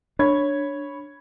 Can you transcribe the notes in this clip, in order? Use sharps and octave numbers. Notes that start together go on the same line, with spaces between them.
D4 C#5 B5 G#6